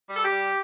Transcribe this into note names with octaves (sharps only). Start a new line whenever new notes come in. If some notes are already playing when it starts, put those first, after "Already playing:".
G3
A4
G4
G3